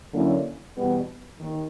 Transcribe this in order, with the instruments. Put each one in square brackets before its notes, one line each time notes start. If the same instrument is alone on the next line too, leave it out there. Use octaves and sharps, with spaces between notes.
[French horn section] D3 F#3 A#3 C#4 E4
E2 B2 G3 B3
D#2 D#3